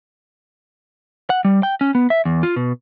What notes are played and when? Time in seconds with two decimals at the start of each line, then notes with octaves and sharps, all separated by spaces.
1.30 F#5
1.45 G3
1.63 G5
1.81 C#4
1.95 B3
2.10 E5
2.25 E2
2.43 F4
2.56 B2